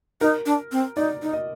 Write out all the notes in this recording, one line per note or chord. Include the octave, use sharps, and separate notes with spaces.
D#4 A#4
D4
C4
D#4 D5
D#4
D#5